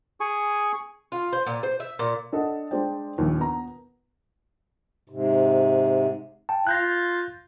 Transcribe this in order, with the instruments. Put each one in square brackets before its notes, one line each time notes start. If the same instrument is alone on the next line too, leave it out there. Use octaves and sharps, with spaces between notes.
[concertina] G#4 G#5 C#6
[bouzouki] F4
C5
A#2
C5
E5
A#2
[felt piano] D4 A4 D#5 F#5
G#3 D4 C5 D5 G5
A#1 D#2
B3 A#5
[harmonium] G#2 C3
[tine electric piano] G5 A5
[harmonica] F4 [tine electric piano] F#6 G6 A#6